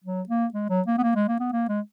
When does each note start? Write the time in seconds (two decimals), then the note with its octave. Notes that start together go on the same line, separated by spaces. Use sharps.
0.04 F#3
0.29 A#3
0.54 G#3
0.70 F#3
0.87 A#3
0.98 B3
1.03 A#3
1.15 G#3
1.28 A#3
1.40 B3
1.53 A#3
1.69 G#3